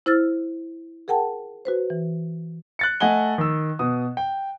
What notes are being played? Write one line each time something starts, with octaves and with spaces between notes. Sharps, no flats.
E4 C5 E6 F6 A6
G#4 A#4 F#5 G5 A5
F#4 B4 C5
E3
F#6 A6 C#7
A3 D#5 F#5 G#5 G7
D#3 E6
B2 D#6
G5